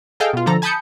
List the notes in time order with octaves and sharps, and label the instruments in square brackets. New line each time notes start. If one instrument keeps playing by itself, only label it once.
[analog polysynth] G#4 A4 D#5 F5 G5
B2 F4
D3 F3 A4 A#5
G#5 A5 B5 D#6 G6 C#7